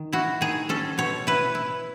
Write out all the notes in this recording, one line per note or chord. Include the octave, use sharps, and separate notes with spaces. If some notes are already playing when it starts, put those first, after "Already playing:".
Already playing: D#3
E4 F#4
D#3 G#4
C#4 A4
B2 C#5
E4 B4
E4